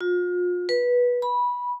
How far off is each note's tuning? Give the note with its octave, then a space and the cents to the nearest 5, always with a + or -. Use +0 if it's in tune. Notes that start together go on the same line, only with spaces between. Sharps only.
F4 +35
B4 -15
B5 -15